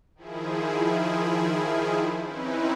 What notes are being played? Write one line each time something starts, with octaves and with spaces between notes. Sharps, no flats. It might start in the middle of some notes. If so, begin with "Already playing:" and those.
D#3 F3 E4 G#4
C4 C#4 D#4 E4 B4